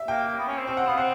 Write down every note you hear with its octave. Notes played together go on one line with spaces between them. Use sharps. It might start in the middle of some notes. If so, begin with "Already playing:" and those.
Already playing: E5
A#3 G5
B3
C#4
C4
C4 G5
F#5
B3 F5
C4 F#5